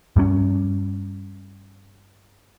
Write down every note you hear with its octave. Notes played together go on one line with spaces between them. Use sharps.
G2 G3 C#4